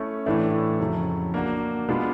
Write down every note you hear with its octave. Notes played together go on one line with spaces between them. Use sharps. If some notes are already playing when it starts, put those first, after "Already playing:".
Already playing: A3 C#4 E4
A2 E3 A3 D4
F2 C#3 F#3
A#3 D4 F#4
B2 G#3 B3 D4 F4